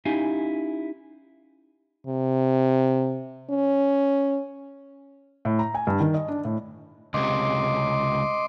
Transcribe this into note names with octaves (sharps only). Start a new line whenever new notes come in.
C#4 D#4 E4 G4 F5 G#5
C3
C#4
A2
A#5
G#5
G2
D#3
D#5
D4
A2
C#2 C3 D#5 C6 D6